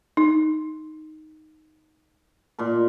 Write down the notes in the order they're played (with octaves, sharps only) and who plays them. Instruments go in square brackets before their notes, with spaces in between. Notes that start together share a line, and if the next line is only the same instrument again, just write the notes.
[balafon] D#4
[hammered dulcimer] A#2 A#4